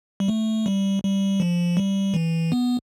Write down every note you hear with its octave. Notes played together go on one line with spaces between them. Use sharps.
G3
A3
G3
G3
F3
G3
E3
B3